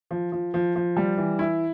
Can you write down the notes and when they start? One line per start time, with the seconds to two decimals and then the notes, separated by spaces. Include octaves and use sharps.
0.11 F3
0.32 F3
0.54 F3
0.76 F3
0.97 G3
1.17 E3
1.39 E4